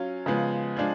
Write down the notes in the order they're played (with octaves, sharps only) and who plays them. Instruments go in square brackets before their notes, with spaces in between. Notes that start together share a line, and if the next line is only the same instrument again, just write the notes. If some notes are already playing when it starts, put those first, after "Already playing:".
Already playing: [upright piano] F#3 C#4 F4
C#3 F3 G#3 B3
F3 G#3 D4